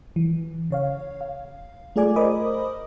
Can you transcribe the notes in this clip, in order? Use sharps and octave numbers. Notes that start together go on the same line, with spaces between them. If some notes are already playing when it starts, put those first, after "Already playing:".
E3
C#3 C#5 F5
F5
A3 F4 G#4 D5 G#5 D6
A#4 C5 D#5 B5 D6 D#6